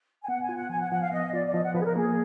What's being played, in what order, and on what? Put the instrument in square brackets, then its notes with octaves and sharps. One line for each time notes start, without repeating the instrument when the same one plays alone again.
[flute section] G#5
[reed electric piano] B3 [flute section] F#5
[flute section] G#5
[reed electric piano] F4
[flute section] F#5
[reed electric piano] F3 [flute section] G#5
[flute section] F#5
[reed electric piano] F3 [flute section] F#5
[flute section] F5
[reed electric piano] B3 [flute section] D#5
[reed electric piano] F4 [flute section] D5
[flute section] D5
[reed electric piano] F3 [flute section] D#5
[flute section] F#5
[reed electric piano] F3 [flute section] B4
[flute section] G#4
A#4
[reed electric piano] A#3 [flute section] G#4